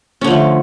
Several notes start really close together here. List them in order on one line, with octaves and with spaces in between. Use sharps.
C#4 D3 F3 A3